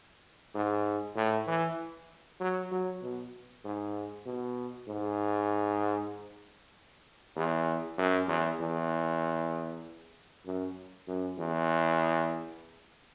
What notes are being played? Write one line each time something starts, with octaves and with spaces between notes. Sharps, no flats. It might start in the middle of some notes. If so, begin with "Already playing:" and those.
G#2
A2
E3
F#3
F#3
B2
G#2
B2
G#2
E2
F#2
E2
E2
F#2
F#2
E2